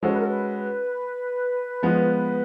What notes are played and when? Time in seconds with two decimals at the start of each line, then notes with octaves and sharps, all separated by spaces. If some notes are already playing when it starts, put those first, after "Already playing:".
0.03 G#3 C#4 F#4 A4 C5
0.11 B4
0.19 A#4
0.28 B4
1.83 F3 G#3 B3